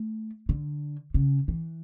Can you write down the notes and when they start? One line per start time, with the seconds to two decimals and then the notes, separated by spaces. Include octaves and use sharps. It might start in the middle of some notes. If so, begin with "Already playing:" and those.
Already playing: A3
0.49 D3
1.14 C#3
1.48 E3